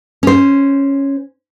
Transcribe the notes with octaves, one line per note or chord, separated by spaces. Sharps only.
C#4 C5